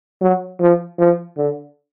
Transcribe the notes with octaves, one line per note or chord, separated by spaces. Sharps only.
F#3
F3
F3
D3